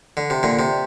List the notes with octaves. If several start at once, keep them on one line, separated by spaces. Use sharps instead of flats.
D3
C3
A#2 D3
C3